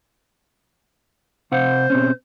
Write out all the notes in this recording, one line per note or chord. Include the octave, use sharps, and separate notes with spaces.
C3 C5 F5 F#5
B2 C4 C#4